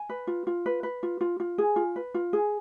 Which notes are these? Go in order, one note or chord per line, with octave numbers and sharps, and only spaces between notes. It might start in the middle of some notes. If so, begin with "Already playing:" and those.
Already playing: G#5
B4
F4
F4
B4
B4
F4
F4
F4
G#4
F4
B4
F4
G#4